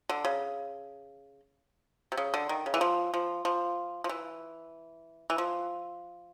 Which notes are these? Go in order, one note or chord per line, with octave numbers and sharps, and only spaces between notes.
D3
C#3
C3
C#3
D3
D#3
C#3
E3
F3
F3
F3
F3
E3
E3
F3